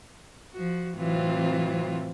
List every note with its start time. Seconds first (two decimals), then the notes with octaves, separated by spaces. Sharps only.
0.54 F3 F#4
0.95 A2 C3 E3 F#3 C4 F4